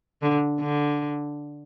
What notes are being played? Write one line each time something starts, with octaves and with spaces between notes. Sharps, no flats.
D3
D3